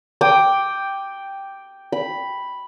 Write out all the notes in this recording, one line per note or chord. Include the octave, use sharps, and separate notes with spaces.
G5 D6 D#6
B5